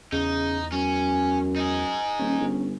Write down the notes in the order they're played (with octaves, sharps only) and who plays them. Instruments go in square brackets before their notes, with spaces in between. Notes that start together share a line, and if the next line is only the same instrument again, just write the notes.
[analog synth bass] E2 [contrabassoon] C#3 [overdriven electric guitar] D#4
[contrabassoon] F#2 [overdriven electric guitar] C#4
[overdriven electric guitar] D#4 G#4
[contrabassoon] D#1 [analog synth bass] C#4
[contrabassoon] G1